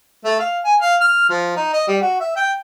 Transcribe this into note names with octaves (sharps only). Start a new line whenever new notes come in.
A3
F5
G#5
F5
F6
F3
D#4
D#5
G3
F#4
E5
G5